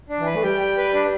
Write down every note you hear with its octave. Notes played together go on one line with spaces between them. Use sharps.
D4
E3
B4
A3
G3 G5
G5
B4
D4